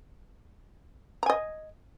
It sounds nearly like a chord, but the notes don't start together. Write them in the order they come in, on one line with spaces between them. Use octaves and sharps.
A#5 G#5 D#5